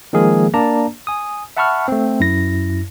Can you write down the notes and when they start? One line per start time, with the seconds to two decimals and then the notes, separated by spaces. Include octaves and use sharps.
0.13 D#3 F3 G#3 A#3 G#4 A#4
0.54 A#3 D4 D5 A5 A#5
1.07 G#5 D#6
1.57 E5 F#5 A5 B5 C#6 F6
1.88 A3 C4
2.20 F#2 E4 A#6